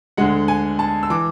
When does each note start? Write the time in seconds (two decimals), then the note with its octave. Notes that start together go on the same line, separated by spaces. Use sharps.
0.17 D2 D3 G#3 F#5
0.48 G#5
0.79 A5
1.03 E6
1.10 E3 D6